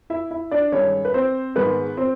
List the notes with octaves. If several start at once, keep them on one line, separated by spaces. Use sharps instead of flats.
E4 E5
E4 E5
D4 D5
G2 D#3 G#3 C#4 C#5
B4
C4 C5
G#2 D#3 G#3 B3 B4
C4 C5